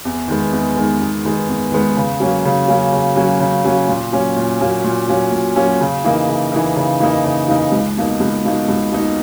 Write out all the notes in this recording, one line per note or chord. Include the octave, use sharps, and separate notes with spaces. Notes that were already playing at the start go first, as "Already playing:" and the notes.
E2
D#3 G#3 B3
E2
D#3 G#3 B3
E2
D#3 G#3 B3
E2
D#3 G#3 B3
C#3
F#3 A#3 C#4
C#3
F#3 A#3 C#4
C#3
F#3 A#3 C#4
C#3
F#3 A#3 C#4
A#2
F#3 A#3 C#4
A#2
F#3 A#3 C#4
A#2
F#3 A#3 C#4
A#2
F#3 A#3 C#4
C#3
E3 A#3 D#4 A#4
C#3
E3 A#3 D#4 A#4
C#3
E3 A#3 D#4 A#4
C#3
E3 A#3 D#4 A#4
C#2
B2 A#3 D#4
C#2
B2 A#3 D#4
C#2
B2 A#3 D#4